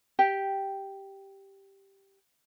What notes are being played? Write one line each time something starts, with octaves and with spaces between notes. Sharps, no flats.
G4 G5